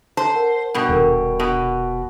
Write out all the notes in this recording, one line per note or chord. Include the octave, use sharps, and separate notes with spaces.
C5 A5
A#4 F#5
G2 B2
D#1 A4 A#4
B2